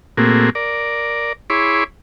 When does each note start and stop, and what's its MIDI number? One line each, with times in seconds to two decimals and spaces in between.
0.17 0.50 46
0.17 0.50 57
0.17 0.50 58
0.17 0.50 60
0.17 0.50 66
0.17 0.50 68
0.55 1.33 70
0.55 1.33 74
1.50 1.84 64
1.50 1.84 68
1.50 1.84 73
1.50 1.84 83
1.50 1.84 84
1.50 1.84 86